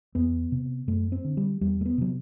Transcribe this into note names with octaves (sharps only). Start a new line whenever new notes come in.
E2 B3
C3
F#2 A3
C4
D3
G3
E2 G3
A3
B3
C3 F#3